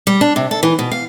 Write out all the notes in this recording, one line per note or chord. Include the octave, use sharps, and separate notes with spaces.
G3
D4
C3
A4
E3
B2
F5